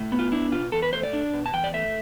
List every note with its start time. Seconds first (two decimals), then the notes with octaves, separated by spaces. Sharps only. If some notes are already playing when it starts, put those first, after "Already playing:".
Already playing: A2
0.12 B3
0.19 F4
0.32 D4 E4
0.52 B2 F4
0.72 E2 A4
0.82 B4
0.93 A3 C5
1.03 D5
1.13 D4
1.33 B2
1.46 A5
1.53 E2 G5
1.64 D5
1.74 A3 E5